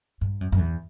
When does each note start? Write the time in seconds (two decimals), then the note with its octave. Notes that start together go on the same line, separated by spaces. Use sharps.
0.21 G2
0.41 F#2
0.52 F#2
0.59 E2